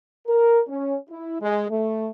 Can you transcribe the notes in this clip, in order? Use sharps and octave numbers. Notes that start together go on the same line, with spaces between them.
A#4
C#4
E4
G#3
A3